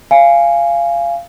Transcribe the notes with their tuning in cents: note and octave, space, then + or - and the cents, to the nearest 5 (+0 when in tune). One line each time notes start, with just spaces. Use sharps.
F5 -20 G#5 +0